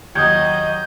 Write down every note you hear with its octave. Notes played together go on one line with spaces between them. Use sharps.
D#2 F#3 D#5 D#6 G6 G#6